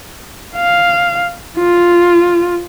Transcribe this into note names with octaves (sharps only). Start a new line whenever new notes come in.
F5
F4